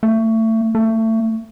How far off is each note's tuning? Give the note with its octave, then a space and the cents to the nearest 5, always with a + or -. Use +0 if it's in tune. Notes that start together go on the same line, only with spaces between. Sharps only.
A3 +25
A3 +25